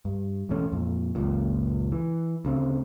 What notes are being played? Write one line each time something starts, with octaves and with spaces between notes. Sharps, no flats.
G2
E1 A1 A3 C#4
F2 A#2
F#1 C#2 A#2
E3
D2 C#3 C4